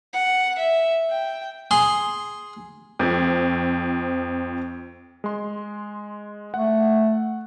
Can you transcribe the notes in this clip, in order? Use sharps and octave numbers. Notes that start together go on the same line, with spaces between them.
F#5
E5
G5
G#4 C6
F2 F3
G#3 C6
A3 F#5